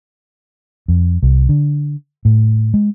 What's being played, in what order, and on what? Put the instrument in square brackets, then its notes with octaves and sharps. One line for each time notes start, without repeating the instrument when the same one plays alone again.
[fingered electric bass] F2
C2
D3
A2
G#3